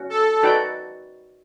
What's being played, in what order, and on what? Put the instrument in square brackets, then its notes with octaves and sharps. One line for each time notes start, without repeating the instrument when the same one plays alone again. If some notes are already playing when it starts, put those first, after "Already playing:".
Already playing: [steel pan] C#4 F#4
[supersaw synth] A4
[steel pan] D#4 F#4 B4 D5 G5